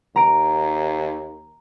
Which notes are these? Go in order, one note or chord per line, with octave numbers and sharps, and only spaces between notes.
D#2 A#5 D7